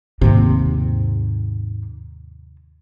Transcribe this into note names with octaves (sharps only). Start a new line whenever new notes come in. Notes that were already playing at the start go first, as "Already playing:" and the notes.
D#2 G#2 C3 A#3